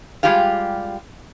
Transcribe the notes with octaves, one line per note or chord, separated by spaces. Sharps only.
G3 G#3 F4 G4 F5